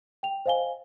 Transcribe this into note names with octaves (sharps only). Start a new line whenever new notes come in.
G5 F7
C5 D#5 F5 G#5 G7